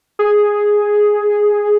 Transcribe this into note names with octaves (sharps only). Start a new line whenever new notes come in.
G#4